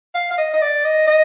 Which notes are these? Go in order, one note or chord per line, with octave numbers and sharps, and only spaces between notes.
F5
F5
D#5
D#5
D5
D#5
D#5